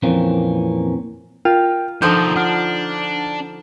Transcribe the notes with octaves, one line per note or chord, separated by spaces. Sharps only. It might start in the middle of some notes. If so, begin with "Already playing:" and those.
F2 A#2 E3 A#3 C4 C#4
F4 A#4 G5
D3 D#3 F3 D#4 A4 G6
D4 F#5 F6